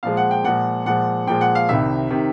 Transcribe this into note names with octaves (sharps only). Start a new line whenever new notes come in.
A#2 F3 G#3 F5
F#5
G5
A#2 F3 G#3 F#5
A#2 F3 G#3 F#5
A#2 F3 G#3 G5
F#5
F5
C2 C3 D#3 E5
C3 D#3